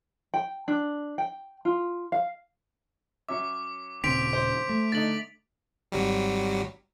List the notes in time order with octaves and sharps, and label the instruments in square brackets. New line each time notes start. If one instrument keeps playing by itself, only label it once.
[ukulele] G5
D4
G5
F4
F5
[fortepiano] F#3 C#4 E5 [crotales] D6
[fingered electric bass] D#1 C#3 [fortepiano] C4 [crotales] B6 D7 F7
[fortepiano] C5
[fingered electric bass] A3
[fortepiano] D3 D#4 [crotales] A6 F#7
[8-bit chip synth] G#1 F#3 G3